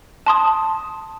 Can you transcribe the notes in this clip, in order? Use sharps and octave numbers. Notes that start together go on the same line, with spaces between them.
A5 C6 D#6